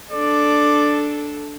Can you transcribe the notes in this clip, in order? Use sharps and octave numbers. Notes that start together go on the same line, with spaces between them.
D4 A4 D5